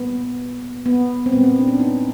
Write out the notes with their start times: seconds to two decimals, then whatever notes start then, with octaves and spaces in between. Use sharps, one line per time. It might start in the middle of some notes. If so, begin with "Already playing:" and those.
Already playing: A#2 G3 A#3 B3
0.86 B3
1.26 C4
1.32 A#2 G3 A#3 B3
1.44 C4
1.58 D4
1.68 C#4
1.80 D#4